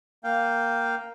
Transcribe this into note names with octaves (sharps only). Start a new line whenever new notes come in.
A#3 F5 G5